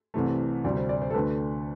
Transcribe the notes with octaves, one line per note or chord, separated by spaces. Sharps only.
C2 C3 E3 A3
D2 C3 G3 D5
C5
D5
C5
A4
D2 D3 A3 B4